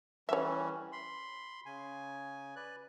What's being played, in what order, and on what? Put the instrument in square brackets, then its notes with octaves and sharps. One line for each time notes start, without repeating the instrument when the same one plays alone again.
[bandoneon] E3 G3 C#4 [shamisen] C#5 E5
[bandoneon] B5 C6
C#3 G#5
B4 D5 F#6